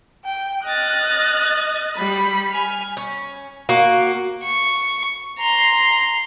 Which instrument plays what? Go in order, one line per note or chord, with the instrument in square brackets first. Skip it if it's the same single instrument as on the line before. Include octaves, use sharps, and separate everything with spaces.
[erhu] G5
[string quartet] D#5 F6 A6 [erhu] F#6
[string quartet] G3 [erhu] B5
[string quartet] G#5 F6
[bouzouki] C#4
A#3 F#4
[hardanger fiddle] C#6
A#5 C6